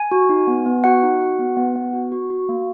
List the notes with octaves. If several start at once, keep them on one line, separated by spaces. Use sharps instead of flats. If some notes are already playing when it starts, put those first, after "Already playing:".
Already playing: G#5
F#4
D#4
B3
B3
F#4 F#5
D#4
F#4
B3
B3
B3
F#4
F#4
F#4
A#3